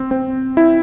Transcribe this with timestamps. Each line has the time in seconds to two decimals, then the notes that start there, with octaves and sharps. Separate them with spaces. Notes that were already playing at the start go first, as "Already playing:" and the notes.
Already playing: C4
0.11 C4
0.57 E4